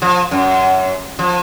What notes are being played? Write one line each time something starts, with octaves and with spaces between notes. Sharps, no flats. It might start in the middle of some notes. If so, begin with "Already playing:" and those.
F3
F#2
F3